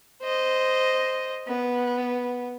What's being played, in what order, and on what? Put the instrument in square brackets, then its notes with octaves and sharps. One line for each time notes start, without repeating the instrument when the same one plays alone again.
[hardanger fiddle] C5 D#5
B3